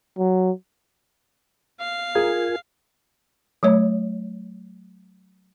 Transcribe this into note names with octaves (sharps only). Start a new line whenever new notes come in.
F#3
F5
F4 G#4 A#4 G#5
F#3 A3 C#5